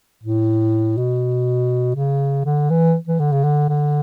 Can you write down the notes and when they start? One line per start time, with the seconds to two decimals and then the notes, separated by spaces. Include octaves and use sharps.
0.23 A2
0.97 B2
1.96 C#3
2.45 D3
2.70 E3
3.07 E3
3.19 D3
3.32 C#3
3.44 D3
3.69 D3